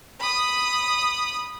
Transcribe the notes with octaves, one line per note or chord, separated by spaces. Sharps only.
B5 D#6